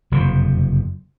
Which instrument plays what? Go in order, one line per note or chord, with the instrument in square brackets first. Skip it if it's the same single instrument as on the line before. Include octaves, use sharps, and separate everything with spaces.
[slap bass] F#1 F2 C3